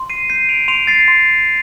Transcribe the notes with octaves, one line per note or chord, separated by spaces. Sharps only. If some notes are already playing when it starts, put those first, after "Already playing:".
Already playing: C6
C7 D#7
G6 C7 D#7
D7 F7
C6 D7 F7
A6 C7
C6